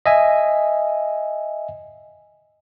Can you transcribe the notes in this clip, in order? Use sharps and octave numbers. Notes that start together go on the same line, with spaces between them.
D#5 E5 G#5